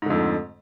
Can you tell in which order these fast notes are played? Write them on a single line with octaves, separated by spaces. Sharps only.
G#2 D3 F2 A3